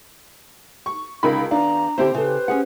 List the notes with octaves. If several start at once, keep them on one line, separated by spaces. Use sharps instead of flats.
C#6
C#2 D3 D#4 A#4 B5
E2 D4 F5 A#5
D3 C4 E4 G4 C5
C#3 A4 B4
C#4 G#4 F#5